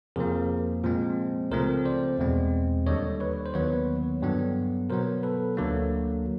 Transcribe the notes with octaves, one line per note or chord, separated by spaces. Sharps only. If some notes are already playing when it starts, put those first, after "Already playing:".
F2 C3 F3 A#3 G#4 A#4
A#2 F3 G#3 C4
C#2 C3 F3 A3 C4 A#4 C5
C5 D5
E2 B2 G#3 C4
D#2 D3 G3 C#5 D#5
B4 C#5
C5
D#2 D#3 F#3 B3 B4 C#5
G2 D3 F#3 B3
B2 F#3 B3 A#4 C5
A4 B4
D2 D3 F#3 A#3